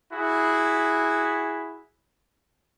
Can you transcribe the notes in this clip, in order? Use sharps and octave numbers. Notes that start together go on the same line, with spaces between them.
E4 F#4 G#4